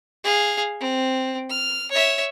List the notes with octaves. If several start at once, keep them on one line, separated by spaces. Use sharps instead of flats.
G#4 F5
C4
F6
C#5 E5